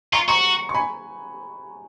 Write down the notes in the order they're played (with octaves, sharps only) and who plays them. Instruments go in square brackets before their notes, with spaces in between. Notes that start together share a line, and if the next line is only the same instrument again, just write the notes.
[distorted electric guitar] F4 [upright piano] A#5 C#6
[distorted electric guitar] F#4 [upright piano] A#5 C#6
[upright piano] C#6
G#5 B5